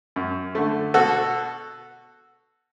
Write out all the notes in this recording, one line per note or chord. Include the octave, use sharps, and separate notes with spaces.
F#2
D3 A3
B2 F#4 A4